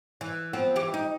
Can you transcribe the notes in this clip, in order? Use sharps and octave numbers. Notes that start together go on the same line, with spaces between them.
E3
F3 B3 C4
E3 E4 G4
D#4